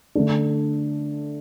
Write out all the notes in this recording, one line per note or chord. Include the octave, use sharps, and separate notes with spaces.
D3 A3 D4